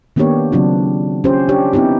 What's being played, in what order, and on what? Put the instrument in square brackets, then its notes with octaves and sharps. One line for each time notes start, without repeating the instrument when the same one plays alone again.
[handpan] D#3 A#3 B3 D4 G4 C#5
C#3 F#3 C4 D4 F4
C#4 F4 G4 C5
D4 G4 C#5
B3 C4 D#4 E4 G4